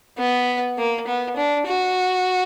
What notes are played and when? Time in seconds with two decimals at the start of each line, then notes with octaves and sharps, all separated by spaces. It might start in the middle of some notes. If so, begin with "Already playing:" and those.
0.18 B3
0.78 A#3
1.07 B3
1.36 D4
1.66 F#4